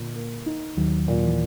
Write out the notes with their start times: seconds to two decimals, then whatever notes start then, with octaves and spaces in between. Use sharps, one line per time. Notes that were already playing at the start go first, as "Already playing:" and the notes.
Already playing: A#2 D3
0.15 A#3
0.46 D#4
0.77 D#2 D#3 F#3
1.08 A#2
1.24 E3